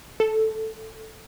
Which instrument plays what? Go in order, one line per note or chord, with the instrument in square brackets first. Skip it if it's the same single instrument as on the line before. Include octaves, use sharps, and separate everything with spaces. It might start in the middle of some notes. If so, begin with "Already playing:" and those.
[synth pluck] A4